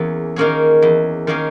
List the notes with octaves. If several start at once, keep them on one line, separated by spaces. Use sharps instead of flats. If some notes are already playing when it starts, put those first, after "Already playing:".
Already playing: E2 A#3 C#4 G#4
D#3 A#3 C#4 G#4
E2
D#3 A#3 C#4 G#4